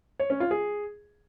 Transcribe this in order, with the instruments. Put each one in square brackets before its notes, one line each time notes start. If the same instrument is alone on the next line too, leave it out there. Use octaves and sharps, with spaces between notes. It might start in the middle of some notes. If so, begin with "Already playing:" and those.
[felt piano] C#5
C#4
F4
G#4